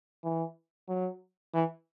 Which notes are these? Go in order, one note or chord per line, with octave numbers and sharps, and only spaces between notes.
E3
F#3
E3